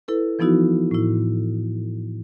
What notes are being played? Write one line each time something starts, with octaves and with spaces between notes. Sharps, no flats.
E4 A4 B4
E3 F3 B3 D#4 E4 F#4
A2 E4